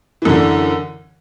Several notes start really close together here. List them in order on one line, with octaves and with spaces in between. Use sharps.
E3 F#2 D3